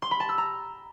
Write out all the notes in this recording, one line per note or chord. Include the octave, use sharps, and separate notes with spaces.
C6
B5
A5
E6
A#5